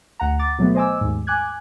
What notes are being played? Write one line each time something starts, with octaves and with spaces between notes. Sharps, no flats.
D2 F#5 A#5
D6 A6
B2 F#3 A3 B3
C5 D#5 G#5 D6 E6
D#2 G#2
G#5 D6 F#6 G#6